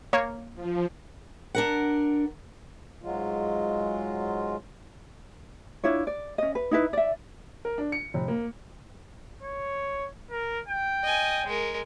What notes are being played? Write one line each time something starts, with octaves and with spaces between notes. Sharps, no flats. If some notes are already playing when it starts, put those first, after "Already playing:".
A#3 C#5
F3
D4 A#4 F#5
G#2 F#3 G#3 F4
D4 E4 F4 C#5
D5
C#4 D#5
B4
D#4 E4 B4
D5 E5
A#4
D4
C#7
F1
A#3
C#5
A#4
G5
D#5 G#5
G#3 A#4